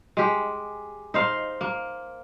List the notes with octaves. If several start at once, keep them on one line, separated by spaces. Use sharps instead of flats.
G#3 G4
D#4 C5 F5
A#3